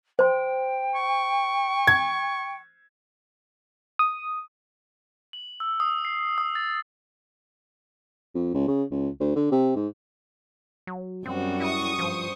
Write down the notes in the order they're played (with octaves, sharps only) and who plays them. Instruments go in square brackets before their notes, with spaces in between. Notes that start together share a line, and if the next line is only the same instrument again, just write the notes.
[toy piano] C5 C6 [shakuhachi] G5
[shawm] C#6
[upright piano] G#6
[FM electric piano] D#6
[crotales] F#7
E6
D#6
C7
D#6
A6
[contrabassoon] F2
C#2
C#3
C#2
D2
D3
C3
G#2
[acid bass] F#3
[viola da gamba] F#2 G3 F#4 [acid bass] C4
[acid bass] E4 [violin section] C#6 D#6
[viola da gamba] G2 C5 [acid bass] F3